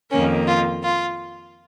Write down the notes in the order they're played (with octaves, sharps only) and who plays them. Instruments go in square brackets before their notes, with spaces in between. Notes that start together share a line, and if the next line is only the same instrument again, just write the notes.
[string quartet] F2 D#3 A#3 C#4
F4
F4